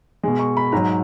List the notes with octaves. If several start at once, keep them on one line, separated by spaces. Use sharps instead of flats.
B2 G#3
C#6
B5
G#2 F#3 A#5